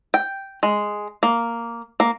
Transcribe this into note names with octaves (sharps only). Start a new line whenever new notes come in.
G5
G#3
A#3
A#3